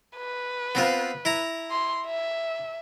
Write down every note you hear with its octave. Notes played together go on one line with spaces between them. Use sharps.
B4
B3 C4 F4
E4 A#5
C6
E5